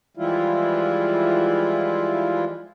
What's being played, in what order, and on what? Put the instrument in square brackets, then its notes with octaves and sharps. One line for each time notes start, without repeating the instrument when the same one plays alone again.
[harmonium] E3 F3 G3 G#3 E4 F4